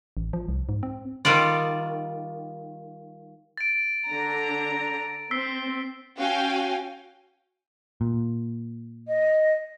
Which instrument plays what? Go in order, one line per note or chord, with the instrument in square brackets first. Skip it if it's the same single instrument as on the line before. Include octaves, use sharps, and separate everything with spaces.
[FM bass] A1
F3
C2
G#2
C4
[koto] D#3 G3 F4 D5
[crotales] A6 D7
[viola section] D3 A#5
[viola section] C4 [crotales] E6 B6 C7
[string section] C#4 F#4 F5 G5 G#5
[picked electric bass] A#2
[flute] D#5